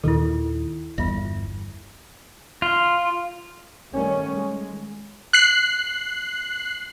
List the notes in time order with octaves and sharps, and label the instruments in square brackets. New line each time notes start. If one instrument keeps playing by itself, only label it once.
[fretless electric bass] D#2 A#2 D#3 [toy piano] E4 A4
[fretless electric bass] G1 E2 [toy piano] F4 E5
[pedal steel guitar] F4
[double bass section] D#3 G3 A3 C#4
G#3
[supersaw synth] F#6 C7